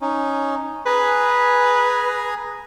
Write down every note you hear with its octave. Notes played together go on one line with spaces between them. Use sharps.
C#4 D#4
G#4 B4 G#5 A#5